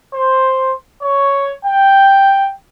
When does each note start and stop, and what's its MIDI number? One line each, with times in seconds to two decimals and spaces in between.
0.13 0.71 72
1.02 1.52 73
1.63 2.49 79